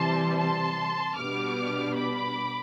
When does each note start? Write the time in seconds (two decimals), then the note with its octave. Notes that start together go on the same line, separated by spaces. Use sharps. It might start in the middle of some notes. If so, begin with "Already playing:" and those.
Already playing: C3 E3 G3 C4 A5 C6
0.39 A5 C6
1.17 B2 G3 B3 D4 D6 F6
1.95 B5 D6